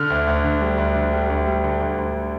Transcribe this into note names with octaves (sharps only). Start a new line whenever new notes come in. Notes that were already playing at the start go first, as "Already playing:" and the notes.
Already playing: D3 F6
D2
D2
D3
G3
D2
D3
G3
D2
G3
D3
D2
D2